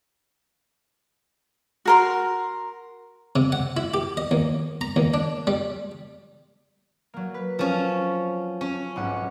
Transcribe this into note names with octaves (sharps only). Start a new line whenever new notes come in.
F#4 A#4 C6
C3
F#5
E4
G4
D#5
D#2
A#5
D#2
D4
G3
F#3 A#3
B4
F3 C#4
C#4
B1 G#2 F#5